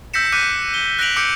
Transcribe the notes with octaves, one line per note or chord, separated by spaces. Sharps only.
E6 G6 A#6 B6 C#7 E7
D6 F#6 G6 B6 C#7 D#7
G7
F#6 A#6 B6 D7 F7 F#7
D6 E6 G6 C#7 D7